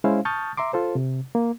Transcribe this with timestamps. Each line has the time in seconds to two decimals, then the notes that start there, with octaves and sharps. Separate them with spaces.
0.04 G#3 C#4 E4 C5 F5
0.25 A5 C#6 D#6 F6 G6 A6
0.57 E5 A#5 C6 D6
0.73 F4 A4 C5
0.95 C3
1.35 A#3